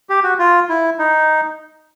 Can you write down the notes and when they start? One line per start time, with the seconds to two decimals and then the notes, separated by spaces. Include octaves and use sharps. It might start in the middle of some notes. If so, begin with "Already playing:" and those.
0.09 G4
0.23 F#4
0.39 F4
0.69 E4
0.99 D#4